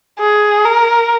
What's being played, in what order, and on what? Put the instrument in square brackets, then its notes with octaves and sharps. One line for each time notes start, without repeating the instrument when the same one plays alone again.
[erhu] G#4
A#4